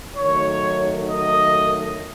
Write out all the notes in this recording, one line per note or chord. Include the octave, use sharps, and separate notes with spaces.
D#3 F#3 A3 C#5
D#5